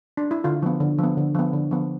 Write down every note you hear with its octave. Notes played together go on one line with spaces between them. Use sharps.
D4
E4
D3 F4
F3 B3
D3
F3
B3
D3
F3 B3
D3
F3 B3